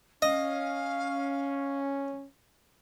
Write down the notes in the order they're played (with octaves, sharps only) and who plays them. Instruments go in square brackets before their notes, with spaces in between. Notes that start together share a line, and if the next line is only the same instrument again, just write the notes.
[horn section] C#4 [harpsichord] D#5 [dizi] F5